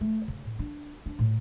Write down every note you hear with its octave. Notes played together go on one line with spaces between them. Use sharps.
A3
C#3
A2
D4
D4
A2